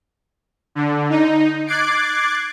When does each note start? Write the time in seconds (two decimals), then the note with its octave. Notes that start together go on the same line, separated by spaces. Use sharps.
0.75 D3
1.10 D#4
1.66 D6 F#6 G#6 A6 C7 D7